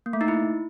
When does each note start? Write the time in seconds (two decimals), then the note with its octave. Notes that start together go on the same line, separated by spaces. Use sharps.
0.06 A#3
0.13 A3
0.21 D#4
0.28 E4